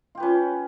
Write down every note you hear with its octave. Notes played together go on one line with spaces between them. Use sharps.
C#4 F4 G4 B4